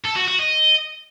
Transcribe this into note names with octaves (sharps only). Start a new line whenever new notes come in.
A4
F#4
F#4
D#5